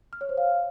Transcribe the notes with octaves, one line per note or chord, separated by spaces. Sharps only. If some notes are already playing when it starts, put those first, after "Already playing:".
F6
C#5
C5
F5